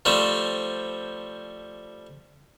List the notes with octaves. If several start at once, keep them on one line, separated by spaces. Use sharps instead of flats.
F3 G3 A3 C4